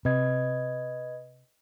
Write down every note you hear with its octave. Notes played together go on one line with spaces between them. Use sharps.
C3 B4 D#5 G#6